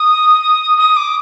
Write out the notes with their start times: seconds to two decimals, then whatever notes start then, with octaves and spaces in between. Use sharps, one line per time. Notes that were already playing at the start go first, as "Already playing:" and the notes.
Already playing: D#6
0.77 D#6
0.96 D6